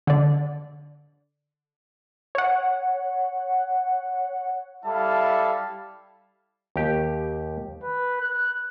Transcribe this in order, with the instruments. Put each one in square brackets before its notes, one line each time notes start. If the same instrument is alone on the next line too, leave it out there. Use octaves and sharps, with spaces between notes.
[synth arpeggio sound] D3 D5
C#5 F#5
[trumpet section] G3 E4 A4 E5 F5 A5
[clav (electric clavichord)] D#2 G4
[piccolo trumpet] B4
F#6